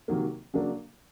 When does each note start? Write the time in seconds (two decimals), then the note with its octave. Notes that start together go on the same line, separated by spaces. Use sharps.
0.08 C3 D#3 F#3 A#3
0.54 C#3 F#3 A#3 D4